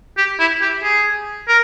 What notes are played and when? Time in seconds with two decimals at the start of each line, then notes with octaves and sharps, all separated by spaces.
0.18 G4
0.40 E4
0.61 G4
0.83 G#4
1.48 A#4